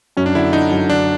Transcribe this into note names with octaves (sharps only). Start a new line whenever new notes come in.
F#2 C#4
D4
D3 E4
D3 D#4
F#2
D3 D4